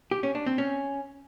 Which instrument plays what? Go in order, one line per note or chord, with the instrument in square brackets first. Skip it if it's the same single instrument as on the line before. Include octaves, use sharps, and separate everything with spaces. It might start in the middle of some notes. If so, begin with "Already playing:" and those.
[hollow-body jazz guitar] G4
C#4
D4
C4
C#4